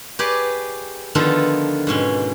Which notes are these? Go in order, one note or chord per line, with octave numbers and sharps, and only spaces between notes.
G4 G#4 B4 C#5 D5
D3 D#3 F3 B3 F4 A4
G#2 B2 C#4